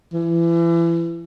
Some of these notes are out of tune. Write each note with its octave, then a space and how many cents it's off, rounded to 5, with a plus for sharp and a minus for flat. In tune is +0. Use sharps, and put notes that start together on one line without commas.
E3 +30